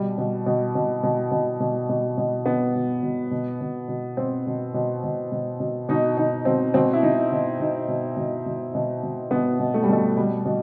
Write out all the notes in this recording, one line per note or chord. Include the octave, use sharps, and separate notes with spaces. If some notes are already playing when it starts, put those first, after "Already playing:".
Already playing: B2 G3
B2
B2
B2
B2
B2
B2
B2
B2
B2 B3
B2
B2
B2
B2
B2
B2 C4
B2
B2
B2
B2
B2
B2 D#4
B2 D#4
B2 C4
B2 C4
E4
B2 D#4
B2
B2 D#4
B2
B2
B2
B2
B2
B2 B3
B2
A3
G3
B2 A3
B2 G3
B2